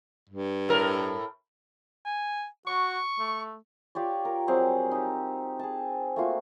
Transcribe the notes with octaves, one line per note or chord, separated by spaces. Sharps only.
G2
A2 A#4
G#5
F#4 C#6
A3
F4 G4 C#5 D5
A#4
F#3 G3 C4 G#4
D#4 G4
G#4 A5
A3 A#3 F4 F#4